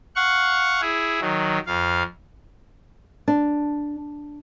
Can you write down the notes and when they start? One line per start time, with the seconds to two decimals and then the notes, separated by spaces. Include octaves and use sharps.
0.16 F5 F#5 C#6
0.81 E4 G#4
1.21 D#3 F#3
1.66 F2 F5
3.28 D4